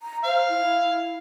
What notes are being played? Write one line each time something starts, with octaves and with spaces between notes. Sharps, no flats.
A#5
C5 F5
E4